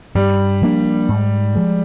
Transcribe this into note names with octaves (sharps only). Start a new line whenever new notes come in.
G2 G3
F3 A#3 D4
G#2
F3 G#3